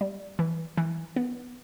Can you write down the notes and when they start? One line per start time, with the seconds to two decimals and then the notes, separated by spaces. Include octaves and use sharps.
0.01 G3
0.39 E3
0.77 E3
1.16 B3